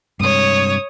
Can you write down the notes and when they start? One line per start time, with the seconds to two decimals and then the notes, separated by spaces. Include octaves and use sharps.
0.20 G2 C3 G#3 C#5 D#6